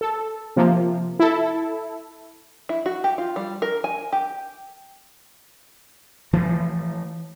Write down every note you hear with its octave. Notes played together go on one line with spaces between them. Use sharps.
A4
C3 F3 A#3
E4 A4
E4
F#4
G4
F4
G3
A#4
G#5
G4
E3 F3 A3